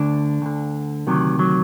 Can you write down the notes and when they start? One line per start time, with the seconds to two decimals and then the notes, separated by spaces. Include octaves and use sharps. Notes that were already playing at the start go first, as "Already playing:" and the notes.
Already playing: D2 D3 D4
0.42 D2 D3
1.07 D2 C3 D#3 F#3
1.39 F#3